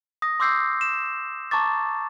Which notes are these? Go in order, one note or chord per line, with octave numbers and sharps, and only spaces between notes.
D#6 A#6
C6 D6 E6 G6 C7
E7
A5 A#5 C#6 D6 A6